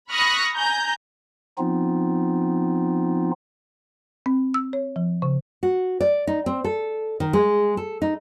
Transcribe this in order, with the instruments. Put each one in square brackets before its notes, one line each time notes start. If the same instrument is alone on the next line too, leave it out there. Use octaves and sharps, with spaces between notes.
[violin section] B5 C#6 D#6 F6 F#6 A#6
G#5 A#5 G6
[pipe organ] F3 B3 C4 D#4 F4
[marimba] C4
E6
C#5
F3
C#3
[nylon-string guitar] F#4
D5
D#4
C4
A4
D#3
G#3
A4
D#4